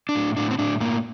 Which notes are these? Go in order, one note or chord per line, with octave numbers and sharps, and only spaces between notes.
D4
A2
A2 D4
C4
A2 D4
A2 A#3